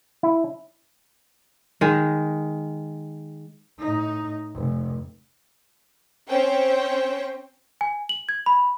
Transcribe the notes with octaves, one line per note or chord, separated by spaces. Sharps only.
E4
D#3 G#3
A2 D#4
F1
C4 C#4 C5 G5
G#5
F#7
G#6
B5